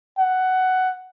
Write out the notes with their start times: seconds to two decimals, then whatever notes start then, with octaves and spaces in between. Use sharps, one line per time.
0.18 F#5